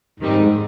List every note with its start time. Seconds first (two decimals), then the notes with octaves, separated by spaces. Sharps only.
0.19 F2 G#2 D#3 G3 C4 D#4